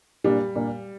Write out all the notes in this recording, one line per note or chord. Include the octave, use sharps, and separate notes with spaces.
A#2 G3 A#3 D4
A#2 A#3 D4